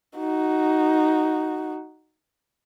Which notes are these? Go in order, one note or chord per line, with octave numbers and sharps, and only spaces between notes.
D#4 F#4